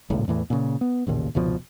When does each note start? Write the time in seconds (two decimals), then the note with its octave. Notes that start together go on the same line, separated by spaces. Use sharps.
0.10 D#1 G#1 C#2 A2
0.28 E2 A2 E3
0.50 A#2 C#3
0.81 B3
1.07 A1 D#2 A#2 C#3
1.35 F1 C#2 B2 F3